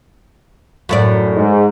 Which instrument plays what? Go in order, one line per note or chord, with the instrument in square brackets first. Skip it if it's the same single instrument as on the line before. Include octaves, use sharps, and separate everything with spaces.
[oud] F#2 A2 D5
[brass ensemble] G#2